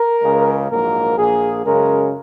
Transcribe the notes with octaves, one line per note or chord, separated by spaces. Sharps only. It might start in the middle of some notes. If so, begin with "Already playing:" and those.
Already playing: A#4
C#2 C#3 G#3
A#1 G#2 F#3 A#3 A#4
A#1 A#2 A#3 G#4
F#2 C#3 G#3 A#4